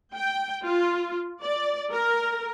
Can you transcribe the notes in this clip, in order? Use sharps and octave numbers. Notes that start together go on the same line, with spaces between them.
G5
F4
D5
A#4